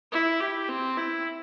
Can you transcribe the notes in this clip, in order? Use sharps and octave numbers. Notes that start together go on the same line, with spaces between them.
E4
G4
C4
E4